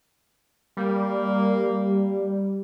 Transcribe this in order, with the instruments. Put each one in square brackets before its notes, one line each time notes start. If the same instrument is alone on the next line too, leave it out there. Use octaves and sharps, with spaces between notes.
[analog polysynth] G3 [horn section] A#3